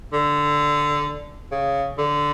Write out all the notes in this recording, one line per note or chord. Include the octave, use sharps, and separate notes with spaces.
D3
C#3
D3